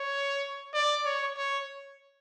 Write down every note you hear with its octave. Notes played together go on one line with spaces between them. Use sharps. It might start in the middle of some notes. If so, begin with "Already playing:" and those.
Already playing: C#5
D5
C#5
C#5